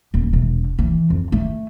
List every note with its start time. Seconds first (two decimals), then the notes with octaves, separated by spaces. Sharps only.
0.14 D#1
0.33 E1
0.79 E3
1.10 F2
1.32 A3